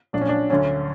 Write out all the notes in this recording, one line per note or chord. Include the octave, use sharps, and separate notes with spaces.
A#1 A#2 F#3 D4
C#4
D4
D2 D3 F#3 C#4